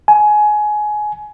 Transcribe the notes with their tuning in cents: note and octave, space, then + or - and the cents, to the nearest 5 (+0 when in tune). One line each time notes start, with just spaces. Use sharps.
G#5 +20